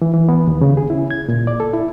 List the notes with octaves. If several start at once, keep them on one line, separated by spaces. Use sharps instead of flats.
E3
E3
B3
D#2
C#3
G#4
E4
G#6
A#2
D5
A4
E4